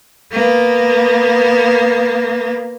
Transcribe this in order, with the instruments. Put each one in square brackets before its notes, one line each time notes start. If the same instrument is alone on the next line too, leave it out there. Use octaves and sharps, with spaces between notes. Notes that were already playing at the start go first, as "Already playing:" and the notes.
[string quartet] A#3 B3